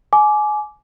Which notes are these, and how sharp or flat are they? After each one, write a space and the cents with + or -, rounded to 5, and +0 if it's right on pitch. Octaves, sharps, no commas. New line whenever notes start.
G#5 +25 D6 -5